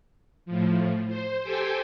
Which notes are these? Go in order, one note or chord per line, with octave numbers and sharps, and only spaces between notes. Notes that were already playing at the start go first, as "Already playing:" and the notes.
A2 F3
C5
G4 A4 C5 G5 G#5